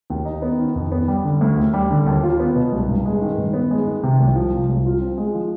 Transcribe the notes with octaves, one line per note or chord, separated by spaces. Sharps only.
D#2
D#4
B3
D#3
F2
B3
G3
D3
D2
D#2
G3
D3
D#2
F4
B3
B2
C2
G2
G#3
D#3
G2
B3
G#3
D#3
C3
C2
F3
C3
C2
F4
C4
G#3
F3